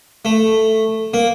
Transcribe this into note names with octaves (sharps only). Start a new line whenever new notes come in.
A3
A#3